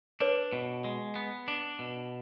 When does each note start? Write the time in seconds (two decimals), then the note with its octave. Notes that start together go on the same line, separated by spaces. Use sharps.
0.20 D4 B4 C#5
0.53 B2
0.84 G#3
1.16 B3
1.48 D4
1.79 B2